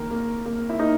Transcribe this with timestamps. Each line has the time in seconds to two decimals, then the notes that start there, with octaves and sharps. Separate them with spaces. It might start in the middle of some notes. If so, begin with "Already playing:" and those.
Already playing: D#3 A#3 A#4
0.11 A#3
0.45 A#3
0.69 E4
0.79 A#3 D#4